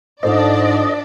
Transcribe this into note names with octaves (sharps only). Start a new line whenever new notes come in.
G#2 D4 F4 A4 C5 D5 D#5